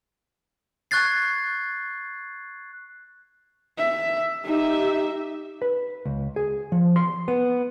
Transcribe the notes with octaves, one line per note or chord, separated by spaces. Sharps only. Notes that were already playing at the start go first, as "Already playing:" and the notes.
C#6 F#6 G#6 A6 C7
E5
D#4 G4 E5
B4
C#2
G#4
F3
C6
B3